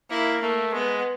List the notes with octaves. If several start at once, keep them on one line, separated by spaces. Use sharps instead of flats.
A#3 E4
A3 A#3
G#3 B3